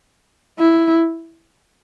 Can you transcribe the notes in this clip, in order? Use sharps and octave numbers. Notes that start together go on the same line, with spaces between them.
E4